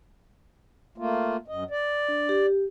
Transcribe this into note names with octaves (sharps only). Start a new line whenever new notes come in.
A3 A#3 F4
F#2 D#5
D5
D4
G4